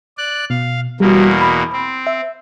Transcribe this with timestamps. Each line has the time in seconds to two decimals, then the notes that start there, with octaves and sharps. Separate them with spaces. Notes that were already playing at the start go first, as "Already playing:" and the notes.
0.18 D5 F#6
0.50 B2 F5
1.00 E2 B2 G3 A#3 F#4
1.41 B5
1.73 C4
2.07 E5